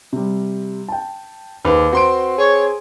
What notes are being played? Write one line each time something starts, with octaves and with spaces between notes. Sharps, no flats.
C3 G3
G5 A5
D#2 G#2 B4 B5
C4 F#4 C6 D7
G#4 C#5